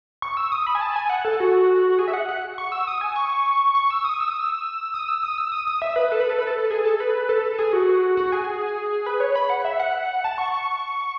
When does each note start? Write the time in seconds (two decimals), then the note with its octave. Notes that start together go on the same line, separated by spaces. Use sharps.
0.22 C#6
0.37 E6
0.52 D#6
0.67 B5
0.75 G#5
0.81 A5
0.96 G#5
1.10 F#5
1.25 A4
1.40 F#4
1.99 G#4
2.08 E5
2.14 F#5
2.29 F#5
2.58 C#6
2.72 E6
2.88 D#6
3.01 G#5
3.16 C#6
3.75 C#6
3.90 E6
4.05 D#6
4.20 E6
4.29 D#6
4.40 E6
4.94 D#6
5.08 E6
5.23 D#6
5.38 E6
5.52 D#6
5.67 D#6
5.82 E5
5.96 B4
6.12 A4
6.20 B4
6.29 A4
6.39 B4
6.47 A4
6.70 G#4
6.85 A4
7.00 B4
7.29 A4
7.58 G#4
7.73 F#4
8.17 F#4
8.32 G#4
9.06 B4
9.20 C#5
9.36 B5
9.50 F#5
9.65 E5
9.80 F#5
10.24 A5
10.38 C#6